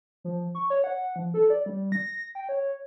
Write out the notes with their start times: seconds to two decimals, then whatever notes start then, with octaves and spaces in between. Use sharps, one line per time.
0.24 F3
0.55 C#6
0.70 C#5
0.84 F#5
1.16 F3
1.34 A4
1.50 D5
1.66 G3
1.92 A#6
2.35 G5
2.49 C#5